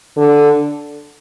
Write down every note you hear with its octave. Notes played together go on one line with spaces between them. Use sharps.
D3